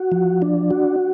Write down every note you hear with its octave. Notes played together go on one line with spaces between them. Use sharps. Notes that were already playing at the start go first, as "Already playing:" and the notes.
Already playing: F#4
F3
D4
F#4